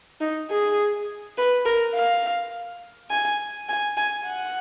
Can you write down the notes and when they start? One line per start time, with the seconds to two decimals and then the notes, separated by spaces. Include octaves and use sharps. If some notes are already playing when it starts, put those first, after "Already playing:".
0.21 D#4
0.51 G#4
1.38 B4
1.65 A#4
1.95 F5
3.11 G#5
3.69 G#5
3.97 G#5
4.26 F#5